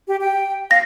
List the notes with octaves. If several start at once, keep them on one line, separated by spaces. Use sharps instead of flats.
G4
G5
F5 A#6